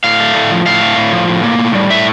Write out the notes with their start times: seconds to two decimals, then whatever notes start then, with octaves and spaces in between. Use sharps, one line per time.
0.04 A2 F5
0.20 A3
0.35 A2
0.51 F3
0.66 A2 F5
0.82 A3
0.97 A2
1.13 F3
1.28 A2
1.44 A#3
1.59 A2
1.75 G3
1.90 A2 E5